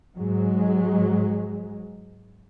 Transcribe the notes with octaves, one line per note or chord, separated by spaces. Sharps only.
G#2 F#3 G#3